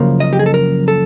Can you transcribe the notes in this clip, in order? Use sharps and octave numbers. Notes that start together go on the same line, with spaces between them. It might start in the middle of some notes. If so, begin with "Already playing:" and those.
Already playing: F#2 C#3 F3 A#3
D#5
G4
G#4
A4
A#4
A4